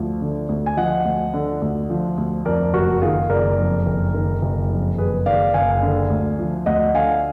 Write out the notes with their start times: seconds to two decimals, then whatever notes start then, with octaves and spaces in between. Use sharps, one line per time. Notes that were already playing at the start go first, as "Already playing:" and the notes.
Already playing: D2 F3
0.21 D3
0.49 D2
0.66 G#5
0.77 F3 D#5 F#5
1.05 D2
1.34 D3
1.62 D2
1.90 F3
2.18 D2
2.45 F2 A#4 D5
2.73 F#1 F#4 A#4
3.02 D#3 F4 G#4
3.30 F#1 A#4 D5
3.58 F2
3.86 F#1
4.14 D#3
4.42 F#1
4.70 F2
4.98 F#1 G#4 B4
5.26 D#3 D5 F5
5.54 F#1 F5 G#5
5.83 D3
6.10 D2
6.39 F3
6.66 D2 D#5 F#5
6.94 D3 F5 G#5